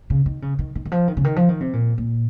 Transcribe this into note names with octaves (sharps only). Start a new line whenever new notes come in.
C#3
D#3
C#3
D#3
D#3
D#3
F3
D#3
C#3
D#3
F3
D#3
C3
A#2
A#2